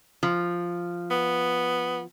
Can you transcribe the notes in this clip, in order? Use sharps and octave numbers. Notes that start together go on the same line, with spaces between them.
F3
B3